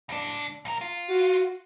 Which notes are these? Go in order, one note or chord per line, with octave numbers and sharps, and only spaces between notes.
C#2 D4
B1 A#4
F4
F#4